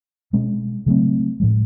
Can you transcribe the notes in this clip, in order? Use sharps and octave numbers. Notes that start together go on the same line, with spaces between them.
B2 G#3 C#4
C#3 F#3 A3 C4
A2 F3 G#3